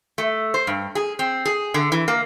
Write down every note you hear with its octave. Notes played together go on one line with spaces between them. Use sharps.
A3
C5
G2
G#4
C4
G#4
D3
E3
A#3